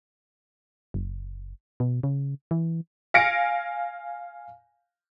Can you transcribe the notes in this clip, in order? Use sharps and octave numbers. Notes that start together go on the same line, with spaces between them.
F#1
B2
C#3
E3
F5 G#5 A#6 C#7 D7